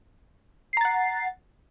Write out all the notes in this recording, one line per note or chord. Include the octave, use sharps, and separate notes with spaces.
F#5 A#5 A6 C7